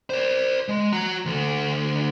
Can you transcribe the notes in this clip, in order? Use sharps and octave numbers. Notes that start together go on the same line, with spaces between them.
C5 D5
G#3
F#4 A#5
D2 A4